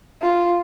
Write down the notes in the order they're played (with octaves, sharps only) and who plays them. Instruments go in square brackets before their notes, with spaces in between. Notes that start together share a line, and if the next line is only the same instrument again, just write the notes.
[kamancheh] F4